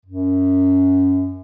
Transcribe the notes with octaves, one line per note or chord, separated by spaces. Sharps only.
F#2